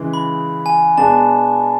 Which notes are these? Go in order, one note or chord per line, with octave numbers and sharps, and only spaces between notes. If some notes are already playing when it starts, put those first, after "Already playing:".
Already playing: C#3 E3 G#3
B5
G#5
B2 G#3 B3 D4 A5